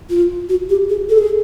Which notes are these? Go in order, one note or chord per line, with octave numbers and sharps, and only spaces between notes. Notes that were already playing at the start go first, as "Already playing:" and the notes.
F4
F#4
G4
G#4
A4
G#4